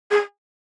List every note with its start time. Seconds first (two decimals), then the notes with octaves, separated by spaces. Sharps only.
0.11 G#4